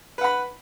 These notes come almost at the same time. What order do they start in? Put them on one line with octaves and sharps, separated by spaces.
B4 F#5 B5